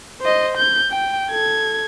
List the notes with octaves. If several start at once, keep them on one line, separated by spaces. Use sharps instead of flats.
C5 D#5
G6
G5
A4 G#6